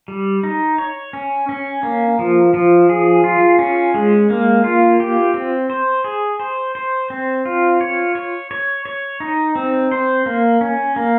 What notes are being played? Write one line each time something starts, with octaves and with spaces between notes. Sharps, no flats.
G3
D#4
C#5
C#4
C#4
A#3
F3
F3
G#4
F4
C#4
G#3
A#3
F4
G4
C4
C5
G#4
C5
C5
C4
F4
C#5
C#5
C#5
C#5
D#4
C4
C5
A#3
C#4
A#3